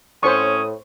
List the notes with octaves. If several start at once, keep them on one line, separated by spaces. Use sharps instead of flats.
A2 C#4 C5 C#6 D#6